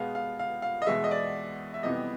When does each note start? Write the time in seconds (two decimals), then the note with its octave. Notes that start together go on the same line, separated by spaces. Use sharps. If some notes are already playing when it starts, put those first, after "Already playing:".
Already playing: B2 G#3 B3 F5
0.15 F5
0.39 F5
0.62 F5
0.82 D#5
0.86 E2 B2 G#3 E5
1.04 D#5
1.11 D5
1.74 E5
1.83 F2 C3 E3 G3 B3 D#5